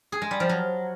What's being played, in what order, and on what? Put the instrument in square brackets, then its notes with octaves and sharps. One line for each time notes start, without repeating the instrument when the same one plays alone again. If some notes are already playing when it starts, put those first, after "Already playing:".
[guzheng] G#4
G#3
G3
F3
F#3